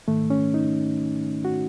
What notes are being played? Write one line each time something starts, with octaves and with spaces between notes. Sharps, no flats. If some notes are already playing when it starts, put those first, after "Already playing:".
G#2 D#3 A3
C#4
D#4
F#4